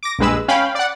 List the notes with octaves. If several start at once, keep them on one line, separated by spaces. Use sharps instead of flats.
D6 A#6
A#1 G2 G#3 B4 E6
C#4 F5 G5 B5
D5 F#5